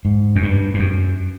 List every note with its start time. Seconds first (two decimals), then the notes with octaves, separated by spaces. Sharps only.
0.05 G#2
0.36 F#2
0.43 G2
0.74 G2
0.80 F#2